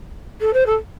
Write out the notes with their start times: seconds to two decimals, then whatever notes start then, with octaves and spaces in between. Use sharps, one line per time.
0.40 A4
0.53 C5
0.66 A4